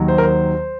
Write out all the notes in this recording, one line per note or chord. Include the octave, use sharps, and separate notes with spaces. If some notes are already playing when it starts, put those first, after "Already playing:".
Already playing: D#2 D#3 F#3
C5
A#4
C5